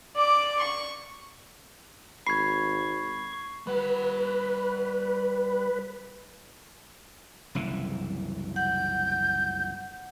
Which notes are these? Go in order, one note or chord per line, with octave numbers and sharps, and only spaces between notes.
D5 D6
C#6
G#1 B5 C#6 G#6 C7
G3 B4 F#5
F#1 C2 E3
F#5 G6